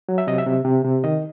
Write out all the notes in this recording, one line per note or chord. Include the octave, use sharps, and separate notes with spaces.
F#3
E5
C3 D#5
E5
C3
C3
C3
D#3 D#5